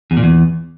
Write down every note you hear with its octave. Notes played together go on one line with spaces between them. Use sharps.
E2
A#2
E2